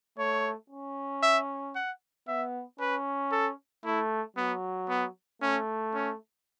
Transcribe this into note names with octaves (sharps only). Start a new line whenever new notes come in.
A3 C#5
C#4
E5
F#5
B3 E5
C#4 B4
A4
A3 E4
F#3 B3
B3
A3 C#4
C#4